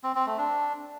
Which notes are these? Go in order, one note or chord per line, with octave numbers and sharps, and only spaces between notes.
C4
C4
A3
D4